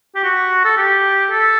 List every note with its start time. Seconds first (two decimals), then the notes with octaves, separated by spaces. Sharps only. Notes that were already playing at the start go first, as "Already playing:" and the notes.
0.16 G4
0.24 F#4
0.65 A4
0.77 G4
1.30 A4